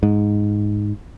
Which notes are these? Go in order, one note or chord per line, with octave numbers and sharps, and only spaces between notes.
G#2